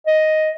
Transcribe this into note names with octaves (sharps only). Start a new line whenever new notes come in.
D#5